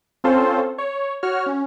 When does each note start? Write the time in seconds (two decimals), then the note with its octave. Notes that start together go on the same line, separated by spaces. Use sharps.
0.24 C4 C#4 F4 A4 C5
0.78 C#5
1.23 F#4 C#5 F6
1.46 C#4